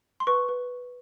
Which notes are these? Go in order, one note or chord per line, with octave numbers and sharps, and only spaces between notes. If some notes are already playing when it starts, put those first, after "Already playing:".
C6
B4 C#6
B4